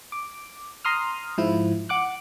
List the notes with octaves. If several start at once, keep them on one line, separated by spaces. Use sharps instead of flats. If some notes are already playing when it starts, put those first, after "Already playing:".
D6
A#5 C6 D#6 F6
G#2 F3 E4
F#5 D6 F#6